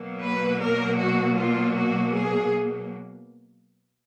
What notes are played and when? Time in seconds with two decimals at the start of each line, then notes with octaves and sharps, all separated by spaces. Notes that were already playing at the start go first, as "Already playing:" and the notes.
Already playing: B2 F#3 A#3
0.23 B4
0.61 A#4
0.99 F#4
1.38 F4
1.76 F#4
2.14 G#4